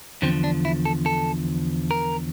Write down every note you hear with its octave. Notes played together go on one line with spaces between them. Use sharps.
E2 D3 F3 C4
D4
E4
A4
A4
A#4